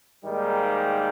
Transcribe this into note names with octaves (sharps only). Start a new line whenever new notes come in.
G#2 D#3 G3 A#3